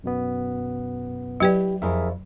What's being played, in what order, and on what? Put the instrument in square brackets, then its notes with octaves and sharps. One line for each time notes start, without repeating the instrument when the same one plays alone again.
[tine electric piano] F#2 B2 B3
[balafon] F#3 B4 D5 [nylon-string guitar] E4 G4
[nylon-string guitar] F2 E4 [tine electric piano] G#4 A#4 E5